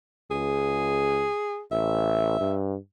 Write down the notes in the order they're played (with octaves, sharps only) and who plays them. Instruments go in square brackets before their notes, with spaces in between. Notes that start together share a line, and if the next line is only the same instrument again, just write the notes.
[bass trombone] C#2 [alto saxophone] G#4
[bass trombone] A1 [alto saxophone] E5
[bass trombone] G2